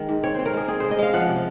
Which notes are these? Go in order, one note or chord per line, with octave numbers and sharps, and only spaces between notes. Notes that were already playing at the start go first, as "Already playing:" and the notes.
Already playing: D#3 G#3
G#2
C4 C#5
C4 C5
A#4
G#3 G#4
C4 G#4
C#3 C5
D#5
G#3 F5
F3 F#5
C3